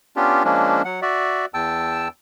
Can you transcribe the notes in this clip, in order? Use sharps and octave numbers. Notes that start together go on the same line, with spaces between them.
B3 C#4 D4 F4 G4
F3 G#3 A#3 C#4 D4
F#3 F#5
F#4 D5 E5
E2 G5 A5 E6